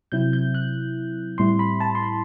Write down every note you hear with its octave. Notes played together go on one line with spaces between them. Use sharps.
C3 F#3 C4 E4 G6
G6
F#6
A2 G3 C4 E4 C6
B5
A5
C6
B5